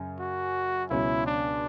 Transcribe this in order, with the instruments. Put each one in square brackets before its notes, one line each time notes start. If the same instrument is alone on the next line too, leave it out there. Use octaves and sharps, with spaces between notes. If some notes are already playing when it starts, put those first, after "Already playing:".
Already playing: [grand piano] F#2 C#3 C#4
[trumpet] F#4
[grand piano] C#2 B2 F#3 C#4 [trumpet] E4
[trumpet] D4